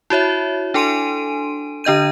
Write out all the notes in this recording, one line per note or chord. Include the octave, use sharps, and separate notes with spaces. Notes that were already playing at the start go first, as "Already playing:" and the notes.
E4 F#4 C#5 E5
D4 A4 G#5 C6 D7 D#7
D3 D4 D#5 G6 D#7